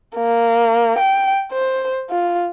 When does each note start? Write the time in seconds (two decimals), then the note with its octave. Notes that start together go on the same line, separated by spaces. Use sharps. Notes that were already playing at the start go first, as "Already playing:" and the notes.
0.16 A#3
0.99 G5
1.52 C5
2.11 F4